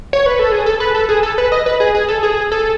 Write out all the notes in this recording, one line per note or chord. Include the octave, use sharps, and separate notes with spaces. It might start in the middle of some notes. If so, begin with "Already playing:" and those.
C#5
B4
A4
G#4
A4
B4
A4
G#4
A4
B4
D#5
B4
G#4
G#4
A4
G#4
A4